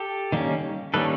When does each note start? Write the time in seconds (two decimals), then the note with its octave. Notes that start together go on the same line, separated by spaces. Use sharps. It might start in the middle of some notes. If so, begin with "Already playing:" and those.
Already playing: G4 A4
0.32 D#3 G3 A#3 C#4
0.94 D#3 G3 A#3 C#4 A4 B4